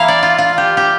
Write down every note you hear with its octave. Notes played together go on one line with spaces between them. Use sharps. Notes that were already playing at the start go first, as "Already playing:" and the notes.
Already playing: E3 A#3 E4 F5
D5
F4
F4
G4
G4